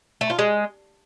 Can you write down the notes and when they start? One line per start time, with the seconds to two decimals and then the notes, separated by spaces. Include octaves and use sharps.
0.21 A3
0.30 F4
0.39 G#3